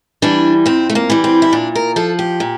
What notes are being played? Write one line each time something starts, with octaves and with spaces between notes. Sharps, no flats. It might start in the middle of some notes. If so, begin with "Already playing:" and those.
E3 G3 D4
F2 C4
A3
A#3
E3 G3
C4
E4
A#2 D4
A#4
F3 A4
G4
A#2